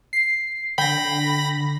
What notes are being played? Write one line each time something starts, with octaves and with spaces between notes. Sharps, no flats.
C7
D3 G5 B5 A#6